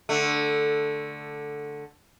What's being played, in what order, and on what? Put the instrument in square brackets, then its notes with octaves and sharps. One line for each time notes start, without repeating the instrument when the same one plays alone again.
[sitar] D3 A3